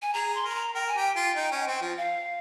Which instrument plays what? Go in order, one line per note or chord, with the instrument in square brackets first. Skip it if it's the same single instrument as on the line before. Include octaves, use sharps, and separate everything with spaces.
[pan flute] G#5
[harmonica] G#4 [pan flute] A#5
[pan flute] C6
[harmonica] A#4
[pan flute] C6
A#5
[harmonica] A#4 [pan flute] G5
[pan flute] G#5
[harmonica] G4 [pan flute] G5
[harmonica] F4
D#4
C#4
C4
F3
[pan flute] F5